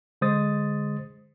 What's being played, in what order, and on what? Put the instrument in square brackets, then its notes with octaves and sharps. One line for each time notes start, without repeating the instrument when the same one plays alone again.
[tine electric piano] D3 G#3 C5 D#6 A6